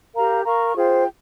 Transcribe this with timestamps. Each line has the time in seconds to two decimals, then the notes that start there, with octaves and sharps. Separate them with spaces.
0.15 G4 A#4 F5 A#5
0.46 A#4 F5 A#5 C#6
0.76 F4 G#4 C5 G5